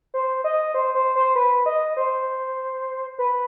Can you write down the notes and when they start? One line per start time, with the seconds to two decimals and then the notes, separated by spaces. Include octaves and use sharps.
0.14 C5
0.44 D#5
0.74 C5
0.95 C5
1.15 C5
1.35 B4
1.66 D#5
1.97 C5
3.19 B4